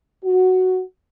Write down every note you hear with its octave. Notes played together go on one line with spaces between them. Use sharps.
F#4